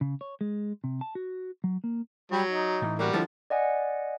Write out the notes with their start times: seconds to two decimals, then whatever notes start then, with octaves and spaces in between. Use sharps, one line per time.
0.01 C#3
0.21 C#5
0.41 G#3
0.84 C3
1.01 A5
1.15 F#4
1.64 F#3
1.84 A#3
2.32 F#3 G3
2.50 D#4
2.82 A2 E3
2.99 G3 A#3 F#4
3.13 D3 E3 F3
3.50 D5 D#5 F#5 G#5